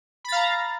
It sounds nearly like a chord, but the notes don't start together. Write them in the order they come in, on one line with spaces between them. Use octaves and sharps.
B5 A6 F5 A#5